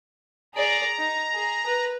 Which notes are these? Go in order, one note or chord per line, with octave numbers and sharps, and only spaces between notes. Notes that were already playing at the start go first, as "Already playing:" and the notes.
G#4 D5 A#5
D#4
G#4
B4